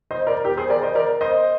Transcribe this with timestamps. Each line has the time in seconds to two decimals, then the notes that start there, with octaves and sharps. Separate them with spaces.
0.11 C5 D#5
0.27 A#4 D5
0.44 G4 A#4
0.57 G#4 C5
0.70 A#4 D5
0.83 C5 D#5
0.95 A#4 D5
1.21 C5 D#5